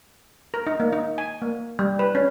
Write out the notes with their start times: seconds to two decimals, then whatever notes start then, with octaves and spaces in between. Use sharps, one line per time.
0.54 A#4
0.67 D#4
0.80 A#3
0.93 D#4
1.18 G#5
1.42 A#3
1.79 G3
1.99 B4
2.15 C#4